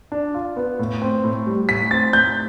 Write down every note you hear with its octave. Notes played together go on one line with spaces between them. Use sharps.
D4
F4
B3
A2
C4
A2
G3
A2 B6
C4 A6
A2 G6